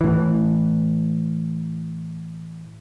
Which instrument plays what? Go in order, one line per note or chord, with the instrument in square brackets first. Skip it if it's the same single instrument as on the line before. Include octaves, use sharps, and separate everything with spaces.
[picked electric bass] A2 E3